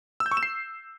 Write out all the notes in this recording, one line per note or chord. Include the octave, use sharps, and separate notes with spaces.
E6
G6
C#6
E7
C7